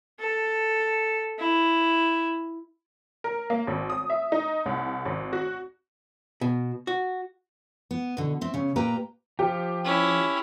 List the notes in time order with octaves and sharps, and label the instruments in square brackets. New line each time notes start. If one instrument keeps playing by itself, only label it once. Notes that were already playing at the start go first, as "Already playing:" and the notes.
[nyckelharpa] A4
E4
[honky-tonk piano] A#4
A#3
G#1
D#6
E5
D#4
C2
G#1
F#4
[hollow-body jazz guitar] B2
F#4
[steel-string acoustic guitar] B3
B2 D3
C4 E5
C#3 C#4
A#2 A#3 G4 B4 G5 A#5
[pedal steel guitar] F3 [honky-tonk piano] G4
[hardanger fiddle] C#4 E4